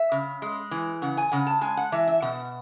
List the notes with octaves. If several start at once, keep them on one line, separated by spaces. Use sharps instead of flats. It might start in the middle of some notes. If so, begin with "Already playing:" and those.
Already playing: E5
C#3
G#3
E3
C#3 F#5
G#5
C#3 F#5
A5
G#3 G#5
F#5
E3 E5
E5
B2 F#5